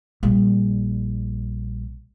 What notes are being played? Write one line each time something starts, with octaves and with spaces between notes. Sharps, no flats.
A#1 G3